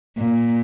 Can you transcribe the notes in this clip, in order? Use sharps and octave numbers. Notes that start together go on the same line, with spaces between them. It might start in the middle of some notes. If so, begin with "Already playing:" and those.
A#2